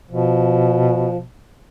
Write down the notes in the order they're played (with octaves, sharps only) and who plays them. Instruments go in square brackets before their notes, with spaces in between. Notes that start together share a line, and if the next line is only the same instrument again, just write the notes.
[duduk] B2 [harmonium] F3